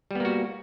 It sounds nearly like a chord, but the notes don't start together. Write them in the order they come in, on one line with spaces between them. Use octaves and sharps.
G3 B3 A#3 F#4